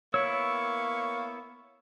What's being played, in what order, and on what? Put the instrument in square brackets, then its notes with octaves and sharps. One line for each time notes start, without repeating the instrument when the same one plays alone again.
[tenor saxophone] A#3 [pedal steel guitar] B3 E4 E6 [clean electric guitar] C#5 [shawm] C#6